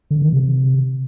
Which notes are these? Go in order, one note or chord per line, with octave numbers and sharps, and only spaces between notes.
D3
D#3
C3